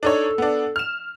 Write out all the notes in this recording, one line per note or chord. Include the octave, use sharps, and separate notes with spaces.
D4 D#4 A4 C#5
B3 D4
F6 E7